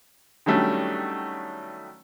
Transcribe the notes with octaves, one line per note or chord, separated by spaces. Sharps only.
D#3 F#3 G3 A3 C#4 D4